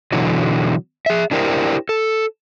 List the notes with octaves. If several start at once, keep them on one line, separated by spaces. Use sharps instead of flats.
B2 D3 E3 F#3
G#4 E5
D4 E4 G4 A#4 C5
A4